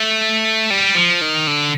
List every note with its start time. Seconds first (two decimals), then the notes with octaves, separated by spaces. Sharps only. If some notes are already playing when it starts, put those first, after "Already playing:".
Already playing: A3
0.70 G3
0.95 F3
1.21 D#3
1.47 D3